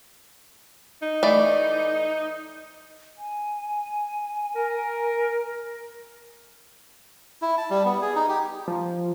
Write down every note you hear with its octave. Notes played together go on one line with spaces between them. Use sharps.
D#4
E3 A3 D5
G#5
A#4
E4
A5
G3
B3
G#4
D#4
G4
F3